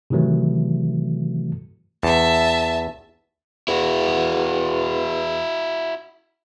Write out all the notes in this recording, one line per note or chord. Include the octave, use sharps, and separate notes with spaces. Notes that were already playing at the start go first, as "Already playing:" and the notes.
C3 D#3 E3 F#3 A3
E2 E5 A5
E2 E4 F#4